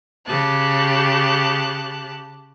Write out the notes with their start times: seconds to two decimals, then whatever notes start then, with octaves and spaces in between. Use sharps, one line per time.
0.26 C#3 G4 A5 F#6